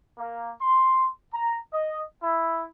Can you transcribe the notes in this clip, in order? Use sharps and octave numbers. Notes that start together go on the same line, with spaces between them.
A#3
C6
A#5
D#5
E4